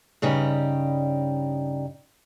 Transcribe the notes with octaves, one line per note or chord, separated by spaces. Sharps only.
G2 C#3 G3 D#4